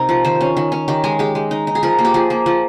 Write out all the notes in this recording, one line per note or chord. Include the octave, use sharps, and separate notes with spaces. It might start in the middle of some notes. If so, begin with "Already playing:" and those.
Already playing: C3 C4 D#4 A#4
F3
D#3 C5
C#4
D#3
C#4
D#3 G4
G#3 G#4
G#3 G4
G#3
D#4
D#4
G#4
F3 A#4
A#3
G4
F3 G#4
A#3
F3